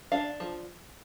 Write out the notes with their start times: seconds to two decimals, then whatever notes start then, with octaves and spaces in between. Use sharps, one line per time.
0.12 D4 F5
0.40 F3